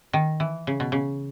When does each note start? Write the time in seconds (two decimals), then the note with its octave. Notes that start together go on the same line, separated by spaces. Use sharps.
0.13 D#3
0.40 E3
0.67 C#3
0.80 B2
0.92 C#3